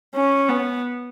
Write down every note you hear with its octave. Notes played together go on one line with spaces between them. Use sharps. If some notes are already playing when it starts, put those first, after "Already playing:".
C#4
B3